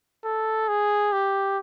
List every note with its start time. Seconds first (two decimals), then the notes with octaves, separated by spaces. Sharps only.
0.24 A4
0.68 G#4
1.12 G4